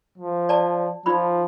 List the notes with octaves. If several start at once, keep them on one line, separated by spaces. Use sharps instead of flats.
F3
D5 A5
F3 D#4 F4 B5